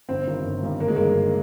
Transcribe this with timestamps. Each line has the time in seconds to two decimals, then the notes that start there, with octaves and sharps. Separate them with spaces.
0.09 G1 C4
0.27 G2 D#3 G3
0.45 G1
0.63 G2 D#3 G3
0.80 G1 A#3
0.88 G#3
0.96 G2 D#3 G3 A#3
1.15 G1